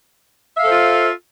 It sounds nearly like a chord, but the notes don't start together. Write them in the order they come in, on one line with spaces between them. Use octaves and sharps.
E5 F5 A4 C5 F4